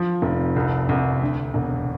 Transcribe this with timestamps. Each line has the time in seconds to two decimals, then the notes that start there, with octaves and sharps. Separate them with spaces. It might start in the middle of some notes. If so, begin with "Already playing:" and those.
Already playing: F3
0.22 F1
0.56 C2
0.89 C2
1.22 D2
1.54 E1